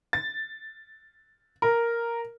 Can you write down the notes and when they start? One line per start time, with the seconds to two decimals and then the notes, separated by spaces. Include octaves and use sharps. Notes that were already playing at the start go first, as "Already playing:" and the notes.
0.13 A6
1.62 A#4